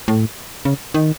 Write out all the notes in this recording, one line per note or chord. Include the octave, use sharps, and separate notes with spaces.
A2
C#3
D#3